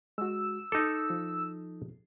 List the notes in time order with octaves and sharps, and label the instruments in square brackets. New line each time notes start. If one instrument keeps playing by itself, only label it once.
[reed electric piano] G#3 F#4 [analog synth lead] E6
[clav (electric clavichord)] D#4 A4 [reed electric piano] D6
[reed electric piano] F3